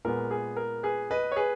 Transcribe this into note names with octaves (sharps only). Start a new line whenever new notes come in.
A#2 G#3 B3 A#4
G#4
A#4
G#4 B4
B4 D#5
C#5
G#4 B4